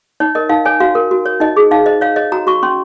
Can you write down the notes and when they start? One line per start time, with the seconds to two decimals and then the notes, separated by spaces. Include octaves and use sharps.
0.20 D#4 C#5
0.35 A#4 D#5
0.49 D#4 F5
0.65 C#5 G#5
0.80 F#4 F5
0.95 A#4
1.11 F#4
1.26 C#5
1.40 D#4 D#5
1.57 G#4
1.71 D#4 F5
1.86 C5 D#5
2.01 C#5 F5
2.16 C#5 D#5
2.32 F#4 A#5
2.47 F#4 C#6
2.63 C#4 C6